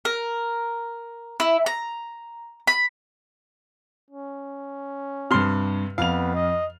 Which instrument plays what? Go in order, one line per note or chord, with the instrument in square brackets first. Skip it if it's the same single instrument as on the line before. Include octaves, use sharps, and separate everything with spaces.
[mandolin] A#4
E4
A#5
B5
[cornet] C#4
[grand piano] G2 F6 [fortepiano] C3 C6
[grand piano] F2 F7 [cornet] B3 [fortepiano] F5
[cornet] D#5